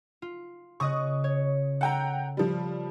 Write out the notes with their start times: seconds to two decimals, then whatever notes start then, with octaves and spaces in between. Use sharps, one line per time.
0.22 F4
0.80 C#3 D#5 C#6 D#6 F#6
1.24 C#5
1.81 A4 F#5 G5 A#5
2.37 F3 G3